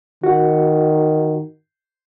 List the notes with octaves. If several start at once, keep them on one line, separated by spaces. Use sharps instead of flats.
D#3 F#4 F#5